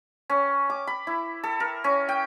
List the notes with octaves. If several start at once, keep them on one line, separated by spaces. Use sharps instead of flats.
C#4
D6
B5
E4
A4
A#4
C#4
G5